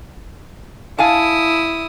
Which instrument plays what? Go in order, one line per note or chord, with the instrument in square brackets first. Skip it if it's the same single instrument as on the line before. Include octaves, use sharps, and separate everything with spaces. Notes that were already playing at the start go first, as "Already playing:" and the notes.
[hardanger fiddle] E4 D#6 [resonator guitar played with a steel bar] F5 G#5 A5